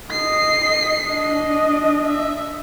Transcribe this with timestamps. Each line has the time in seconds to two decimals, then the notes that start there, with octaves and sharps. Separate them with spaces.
0.11 D#5 C7
1.06 D4 D#5
2.06 E5